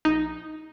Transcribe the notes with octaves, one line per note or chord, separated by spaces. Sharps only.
A#1 D#4